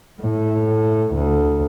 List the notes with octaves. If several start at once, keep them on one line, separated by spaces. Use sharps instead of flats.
A2
D2